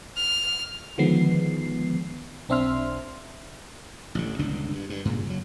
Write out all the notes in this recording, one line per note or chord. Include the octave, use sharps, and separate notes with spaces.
F6
D3 D#3 F3 G#3 B3 C7
B1 C4 D4 E5 C6 F6
A1 D3
G1 C#2 B2 D4
G2
G2
G2 A#2 C#3
F#1 F#3